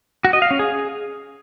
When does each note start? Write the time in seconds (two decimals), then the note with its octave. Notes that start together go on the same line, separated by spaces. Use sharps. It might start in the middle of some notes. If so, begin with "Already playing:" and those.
0.25 F#4
0.33 D#5
0.42 F5
0.51 C#4
0.59 G#4